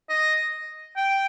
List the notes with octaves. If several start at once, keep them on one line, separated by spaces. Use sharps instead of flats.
D#5
G5